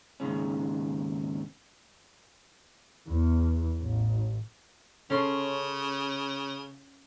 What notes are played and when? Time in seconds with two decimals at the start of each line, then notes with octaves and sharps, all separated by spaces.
0.20 D#2 G#2 C#3 C#4
3.06 E2
3.81 A1
5.10 C#3 C#4 A4 C6